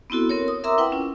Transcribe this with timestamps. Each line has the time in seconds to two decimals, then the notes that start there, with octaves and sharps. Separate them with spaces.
0.10 B3 C4 E4 F#4 A4
0.30 C4 A#4 C#5
0.48 D#6
0.64 A#4 E5 A#5 C6 D6 E6
0.78 E4 B4 F#5 G5
0.92 C#4 F4